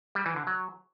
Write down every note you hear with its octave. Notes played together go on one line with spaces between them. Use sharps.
G3
E3
D3
F#3